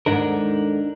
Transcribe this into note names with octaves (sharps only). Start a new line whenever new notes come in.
D#2 G#2 D3 D4 D#4 A#4